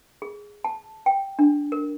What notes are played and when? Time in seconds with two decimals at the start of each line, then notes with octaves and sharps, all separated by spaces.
0.22 G#4
0.64 A5
1.06 G5
1.39 D4
1.72 A#4